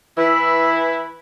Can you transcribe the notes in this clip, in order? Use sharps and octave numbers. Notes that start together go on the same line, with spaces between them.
E3 E4 B4 E6